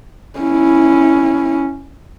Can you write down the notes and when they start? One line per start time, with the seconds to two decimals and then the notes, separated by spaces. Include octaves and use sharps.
0.40 C#4 E4